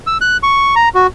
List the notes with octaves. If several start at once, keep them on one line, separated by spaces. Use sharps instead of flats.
E6
F#6
C#6
A#5
F#4